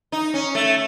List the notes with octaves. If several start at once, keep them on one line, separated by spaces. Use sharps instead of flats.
D#4
C#4
A3